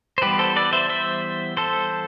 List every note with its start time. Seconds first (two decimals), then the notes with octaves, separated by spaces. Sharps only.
0.18 C5
0.22 E3 G3 B3 G4 B4
0.39 A4 C5
0.56 B4 D5
0.73 C5 E5
0.89 C5 E5
1.57 A4 C5